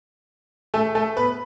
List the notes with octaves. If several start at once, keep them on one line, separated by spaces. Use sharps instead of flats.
A3 A4
A3 A4
B3 B4